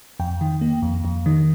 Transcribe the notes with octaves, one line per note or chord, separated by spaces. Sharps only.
F2 G5
D#3
A#3
F2
F2
D#3